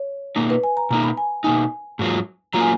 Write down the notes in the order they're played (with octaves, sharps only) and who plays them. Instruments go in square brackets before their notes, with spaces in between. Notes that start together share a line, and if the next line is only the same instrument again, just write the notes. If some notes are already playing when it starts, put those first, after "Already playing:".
Already playing: [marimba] C#5
[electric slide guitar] B2 A#3 D#4
[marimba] B4
G#5
A#5
[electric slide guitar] B2 A#3 D#4 [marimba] A#5
[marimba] B5
G#5
[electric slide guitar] B2 A#3 D#4 [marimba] G#5
[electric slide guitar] G#2 F#3 A#3 F4
[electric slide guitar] F#3 A#3 F4 [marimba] A#5
[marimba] G#5